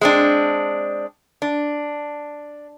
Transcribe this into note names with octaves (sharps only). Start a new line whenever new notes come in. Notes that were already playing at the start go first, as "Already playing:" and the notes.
G#3 C4 D4
D4